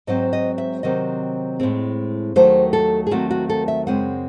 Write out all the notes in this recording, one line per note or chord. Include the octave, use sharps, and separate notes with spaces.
G#2 F#3 C4 D#5
D#5
E5
C3 D#3 F#3 C4 D#5
A2 G#3 C4
D#2 D#3 F#3 A3 C5
A4
G#4
D#2 D#3 F#3 A3 C4 F#4
F#4
A4
E5
F#2 C#3 G#3 C4 F#5